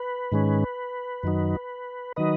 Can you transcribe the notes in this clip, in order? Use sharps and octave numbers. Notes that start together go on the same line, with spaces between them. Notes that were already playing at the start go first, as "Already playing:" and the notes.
Already playing: B4
G#2 D#3 G#3 C#4
F#2 D#3 F#3 D#4
D#3 F#3 D#4 B4 D#5